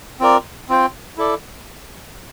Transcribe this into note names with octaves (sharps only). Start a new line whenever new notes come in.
C4 F4 A#4 D5
C4 F4 C5
E4 A4 D5